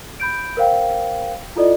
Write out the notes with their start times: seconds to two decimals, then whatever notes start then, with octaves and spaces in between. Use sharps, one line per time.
0.20 B5 G6 D7
0.57 A#4 C5 F5 G5
1.56 E4 F4 A4 D5 D#5